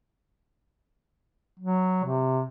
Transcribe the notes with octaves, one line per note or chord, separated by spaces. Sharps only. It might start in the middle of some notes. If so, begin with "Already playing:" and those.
F#3
C3